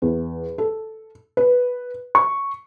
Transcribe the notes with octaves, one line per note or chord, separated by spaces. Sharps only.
E2
A4
B4
C#6